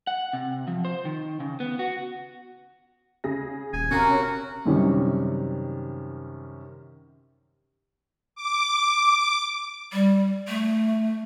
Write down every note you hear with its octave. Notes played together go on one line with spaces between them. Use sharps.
F#5
C3
F3
C5
D#3
C#3
B3
F#4
C#3 G#4 A#6
D#1 G#5
C3 C#4 F#4 A#4 A#5
F#2 C3 D#3 G3 C#4
D6
G3
A3